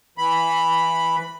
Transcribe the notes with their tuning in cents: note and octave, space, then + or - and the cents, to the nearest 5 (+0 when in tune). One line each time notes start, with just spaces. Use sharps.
E3 +0 B5 +0